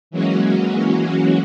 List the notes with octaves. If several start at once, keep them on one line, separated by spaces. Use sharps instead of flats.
E3 F#3 G#3 A#3 C#4 F#4